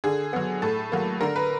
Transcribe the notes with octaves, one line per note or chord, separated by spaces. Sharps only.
D3 G#4
F#3 B3
A2 A4
F#3 A#3
D3 A#4
B4